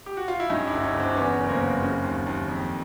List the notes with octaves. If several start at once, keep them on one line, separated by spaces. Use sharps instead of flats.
G4
F#4
F4
E4
G2 C#4 D#4
D4 E4
G1
C#4 D#4
G1
C4 D4
D4
E2 B3 C#4
F#1
A#3 C4
F#1
C#3
D#2
D#2
F2